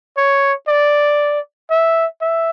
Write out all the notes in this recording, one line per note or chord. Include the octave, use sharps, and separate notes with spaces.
C#5
D5
E5
E5